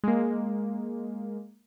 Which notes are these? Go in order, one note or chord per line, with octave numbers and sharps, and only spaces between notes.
G#3 A#3